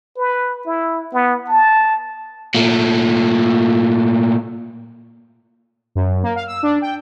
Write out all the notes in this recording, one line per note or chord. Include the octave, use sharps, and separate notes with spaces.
B4
E4
B3
A5
A#2 A3
F#2
A#3
F5
E6
D4
G5